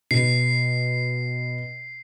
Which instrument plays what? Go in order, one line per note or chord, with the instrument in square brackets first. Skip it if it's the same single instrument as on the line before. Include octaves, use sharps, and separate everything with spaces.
[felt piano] B2 [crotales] C7